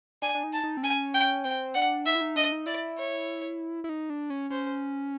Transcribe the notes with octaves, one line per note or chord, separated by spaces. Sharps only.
D4 G#5
D4
D#4
A5
D#4
C4
C#4 G#5
G5
C4 G5
D4 F#5
D#4 E5
E4
D#4
D4 D#5
D#4
E4 D5
C#5
E4
D#4
D4
C#4
C#4 C5